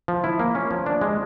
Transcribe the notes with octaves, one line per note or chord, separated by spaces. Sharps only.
F3
E4
A#3
C#4
F3
D4
G#3